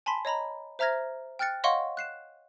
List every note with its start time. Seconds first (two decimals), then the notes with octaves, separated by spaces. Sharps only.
0.06 G#5 A5 B5 C6 B6
0.25 C#5 D#5 A#5 B5
0.79 C5 E5 A#5 F6 G#6 A#6
1.39 G5 F6 F#6 A6 C#7
1.64 C#5 D#5 F5 F#5 C6 C#6
1.97 F#6 C7 E7